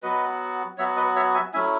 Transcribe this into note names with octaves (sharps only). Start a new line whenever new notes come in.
F#3 B3 F#4 B4 D#5
F#3 B3 F#4 C#5 E5
B4 D#5
C#5 E5
E5 G#5
F#3 A3 C#4 E4 E5 G#5